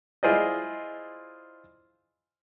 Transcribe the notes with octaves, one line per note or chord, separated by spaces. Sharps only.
E4 F4 G#4 C5 D5 D#5